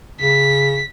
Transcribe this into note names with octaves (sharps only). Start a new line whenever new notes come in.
C#3 B6